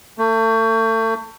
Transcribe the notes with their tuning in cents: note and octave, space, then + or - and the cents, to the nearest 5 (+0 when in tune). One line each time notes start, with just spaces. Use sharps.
A3 +35